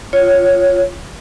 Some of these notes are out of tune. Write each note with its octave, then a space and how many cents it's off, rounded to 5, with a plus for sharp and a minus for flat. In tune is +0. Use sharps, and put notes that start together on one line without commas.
F4 +0 C#5 +0